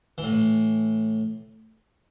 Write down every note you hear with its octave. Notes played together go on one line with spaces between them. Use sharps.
E3
A2